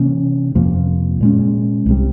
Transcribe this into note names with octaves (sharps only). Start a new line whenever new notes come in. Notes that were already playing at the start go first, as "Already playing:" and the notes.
Already playing: C3 E3 A#3 C#4
F2 C3 F3 A#3
A#2 G#3 C#4
C2 C3 G3